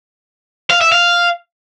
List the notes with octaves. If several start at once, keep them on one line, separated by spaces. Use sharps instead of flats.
F5
E5
F5